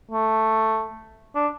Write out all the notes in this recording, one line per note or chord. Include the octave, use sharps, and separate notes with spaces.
A3
D4